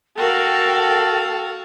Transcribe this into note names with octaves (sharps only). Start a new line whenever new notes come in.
F#4 A4 A#4 F5 G5